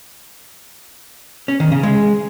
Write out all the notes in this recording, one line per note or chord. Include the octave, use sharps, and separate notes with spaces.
C#4
D#3
C#3
G#3